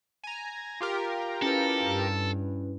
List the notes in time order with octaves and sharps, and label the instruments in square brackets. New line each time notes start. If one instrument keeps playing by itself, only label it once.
[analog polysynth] G#5 A#5
F4 G4 A#4
[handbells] C#4 E4 B4 [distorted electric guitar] A4
[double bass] G2